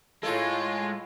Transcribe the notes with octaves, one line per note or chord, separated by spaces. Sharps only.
A2 G#3 F4 A4